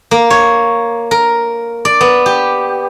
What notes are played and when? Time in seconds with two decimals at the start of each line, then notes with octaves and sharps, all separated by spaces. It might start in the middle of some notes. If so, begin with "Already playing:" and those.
0.11 A#3
0.30 C#5
1.11 A#4
1.85 D5
2.01 B3
2.26 G4